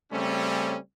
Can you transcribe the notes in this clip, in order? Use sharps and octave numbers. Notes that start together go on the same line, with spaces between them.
C#3 G3 A3 C4 C#4